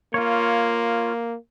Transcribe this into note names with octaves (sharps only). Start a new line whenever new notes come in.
A#3 F4 C#5